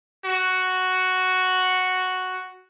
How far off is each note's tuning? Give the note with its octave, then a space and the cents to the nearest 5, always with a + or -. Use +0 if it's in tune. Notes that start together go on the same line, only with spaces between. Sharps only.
F#4 +0